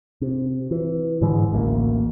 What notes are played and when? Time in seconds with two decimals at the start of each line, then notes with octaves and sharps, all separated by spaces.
0.21 C3
0.71 E3
1.22 G#2 D3 E3 G#3
1.53 A1 D2 G3 A#3